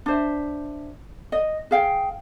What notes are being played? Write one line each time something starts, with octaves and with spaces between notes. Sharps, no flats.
D4 C5 E5
D#5
G#4 F5 G5